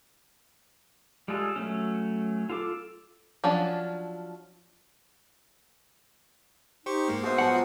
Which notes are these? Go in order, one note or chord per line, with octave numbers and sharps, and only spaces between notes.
G3 G#3 F4 G#4 A4
F#3 A3 C#4
F4 A4 D6
F3 F#3 C#4 D4
D#4 G4 C5 C#6
G#2 G#3 A#3
G#2 B3 F#4 C5 E5
G#2 F3 F#3 F#5